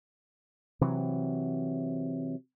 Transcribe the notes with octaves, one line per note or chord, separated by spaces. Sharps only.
C3 E3 F#3